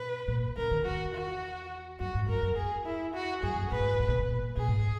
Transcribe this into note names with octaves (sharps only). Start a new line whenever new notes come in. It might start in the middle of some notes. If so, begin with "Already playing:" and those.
Already playing: B2 B4
A#2
C#3 A#4
D#3
E2 F#4
F#4
F#2 F#4
G#2
F#2 A#4
F#2
E2 G#4
E4
F#4
F#2 G#4
F#2
A#2 B4
G#2
A#2
B2
A#2
A#2 G#4
G#2